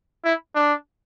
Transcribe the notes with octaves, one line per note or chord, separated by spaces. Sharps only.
E4
D4